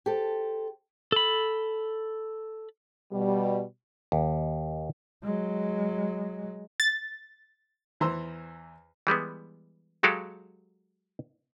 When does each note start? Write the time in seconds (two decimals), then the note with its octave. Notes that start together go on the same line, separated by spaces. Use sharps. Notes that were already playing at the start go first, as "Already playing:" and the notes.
0.06 G4 A4 C5
1.12 A4 B5
3.11 B2 G3
4.12 D#2
5.23 F#3 G#3
6.80 A6
8.00 E2 E3 C5 A#5 C6 E6
9.07 E3 G3 G#3 B3
10.03 F#3 G#3 F#4 G4 A4 F5